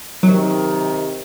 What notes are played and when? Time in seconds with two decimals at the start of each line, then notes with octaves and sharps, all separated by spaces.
0.23 C3 D#3 F#3